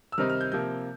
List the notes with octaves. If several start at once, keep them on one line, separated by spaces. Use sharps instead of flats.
E6
C3 D#3 G3 C4 D#4 F6
F6
G6
C3 F3 A#3 G6